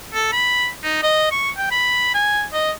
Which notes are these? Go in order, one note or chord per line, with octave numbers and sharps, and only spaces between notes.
A4
B5
D#4
D#5
C#6
G5
B5
G#5
D#5